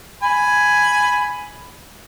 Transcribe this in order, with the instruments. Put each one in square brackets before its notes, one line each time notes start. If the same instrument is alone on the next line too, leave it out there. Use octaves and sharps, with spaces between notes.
[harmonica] G#5 B5